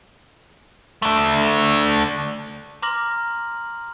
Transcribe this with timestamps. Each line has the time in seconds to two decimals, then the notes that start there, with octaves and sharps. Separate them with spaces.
1.02 A3 D4
2.82 A#5 C6 D6 F6 A#6 F#7